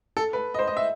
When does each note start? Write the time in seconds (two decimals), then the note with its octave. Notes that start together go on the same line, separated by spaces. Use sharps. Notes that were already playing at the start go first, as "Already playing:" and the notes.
0.17 A4
0.33 B4
0.54 D#5
0.59 C5
0.68 D#5
0.77 E5